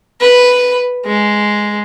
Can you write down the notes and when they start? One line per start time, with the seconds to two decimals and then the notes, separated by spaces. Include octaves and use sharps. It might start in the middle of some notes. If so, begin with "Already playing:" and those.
0.21 B4
1.06 G#3